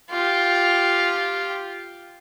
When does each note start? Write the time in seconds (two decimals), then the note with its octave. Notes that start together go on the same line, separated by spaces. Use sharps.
0.11 F4 G4